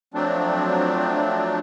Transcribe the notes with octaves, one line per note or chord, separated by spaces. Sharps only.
F3 F#3 A3 C4 D4